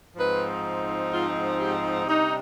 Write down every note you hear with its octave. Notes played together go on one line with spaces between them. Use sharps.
G#2 F3 C4 D#4 B4
F4
G4
C3 G3 D4 D#4